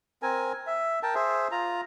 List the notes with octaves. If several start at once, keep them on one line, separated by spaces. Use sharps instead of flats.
C4 A#4 G#5
E5
A#4 G5 A5
G#4 C5 E5
F4 A#5